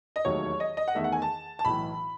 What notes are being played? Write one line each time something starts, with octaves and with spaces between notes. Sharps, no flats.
D#5
E1 D#2 D#3 F#3 A3 C#5
D#5
D#5
F#5
E2 D#3 A3 E5
F#5
G#5
A5
A5
B1 A2 E3 B5